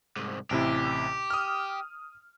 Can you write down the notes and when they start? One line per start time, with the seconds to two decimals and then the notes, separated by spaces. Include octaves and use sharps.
0.16 C2 G#2
0.51 A1 C3 E4 G4
1.30 D#6 F6